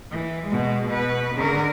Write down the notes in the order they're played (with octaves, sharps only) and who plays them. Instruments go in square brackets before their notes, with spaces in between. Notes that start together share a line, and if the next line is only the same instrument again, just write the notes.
[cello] E3
B2 G#3
B2 B4
D3 A#4